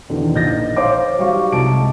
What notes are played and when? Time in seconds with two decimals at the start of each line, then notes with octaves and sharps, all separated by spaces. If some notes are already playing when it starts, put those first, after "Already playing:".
0.09 E2 B2 D3 D#3
0.34 A#1 D#4 G6 A6 A#6
0.76 C5 C#5 F5 D6
1.18 F#3 G3 D#4 F5 C#6
1.52 C2 G#3 G#4 A5 D6 D7